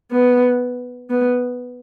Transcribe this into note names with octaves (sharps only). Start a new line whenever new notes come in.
B3
B3